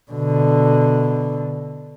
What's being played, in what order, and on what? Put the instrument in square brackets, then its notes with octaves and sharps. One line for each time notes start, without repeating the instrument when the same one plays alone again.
[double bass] B2 D3